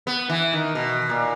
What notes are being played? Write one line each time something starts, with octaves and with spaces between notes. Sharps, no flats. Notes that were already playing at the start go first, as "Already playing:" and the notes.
B3
E3
D#3
B2
A#2